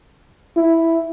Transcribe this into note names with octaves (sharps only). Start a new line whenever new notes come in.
E4